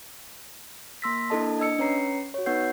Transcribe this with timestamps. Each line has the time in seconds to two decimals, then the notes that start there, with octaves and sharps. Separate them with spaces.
1.02 A#3 C6 E6 A#6 B6
1.30 A#3 D4 E4 A4 D#5 A5
1.59 D4 D#5 E6 C#7
1.79 C#4 B4 C#5 A#5 C7 C#7
2.34 F#4 C#5
2.46 B3 D#4 B4 F#5 G6 C7